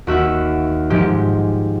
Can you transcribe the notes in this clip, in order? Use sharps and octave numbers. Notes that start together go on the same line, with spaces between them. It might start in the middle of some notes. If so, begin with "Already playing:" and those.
D#2 F#4 E5 F#6
G#2 F3 G#3 G4